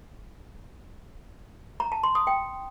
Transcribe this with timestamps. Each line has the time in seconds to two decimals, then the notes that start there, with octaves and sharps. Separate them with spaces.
1.80 A#5
1.92 A5
2.03 C6
2.15 D#6
2.27 G5